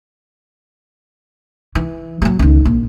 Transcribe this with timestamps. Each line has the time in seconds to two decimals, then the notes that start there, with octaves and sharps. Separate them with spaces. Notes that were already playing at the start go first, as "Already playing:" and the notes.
1.75 E3
2.22 F#3 G#3
2.39 C#2 D#3
2.65 A#1